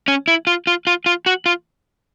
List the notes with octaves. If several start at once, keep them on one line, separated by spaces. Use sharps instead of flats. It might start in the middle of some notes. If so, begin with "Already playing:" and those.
C#4
E4
F4
F4
F4
F4
F#4
F4